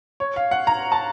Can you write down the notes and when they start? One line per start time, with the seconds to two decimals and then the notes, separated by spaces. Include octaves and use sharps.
0.20 C#5
0.36 F5
0.51 F#5
0.67 A#5
0.92 A5